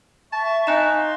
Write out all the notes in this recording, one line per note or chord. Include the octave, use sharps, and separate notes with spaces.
E5 A5 C#6
D#4 G#5 F#6 E7
F5 C6